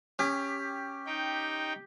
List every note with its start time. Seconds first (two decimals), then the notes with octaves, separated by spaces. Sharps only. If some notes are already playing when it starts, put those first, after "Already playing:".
0.19 C#4 G4
1.06 D#4 G5